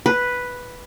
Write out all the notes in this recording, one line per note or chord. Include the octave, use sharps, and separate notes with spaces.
B4